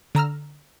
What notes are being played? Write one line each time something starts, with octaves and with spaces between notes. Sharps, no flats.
D3 A#5 E6 F6